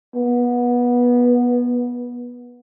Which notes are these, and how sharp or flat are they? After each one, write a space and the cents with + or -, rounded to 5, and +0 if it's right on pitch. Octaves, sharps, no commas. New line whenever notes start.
B3 -20